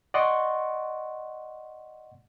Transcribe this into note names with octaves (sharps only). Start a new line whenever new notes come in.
D5 D#5 F#5 C6 C#6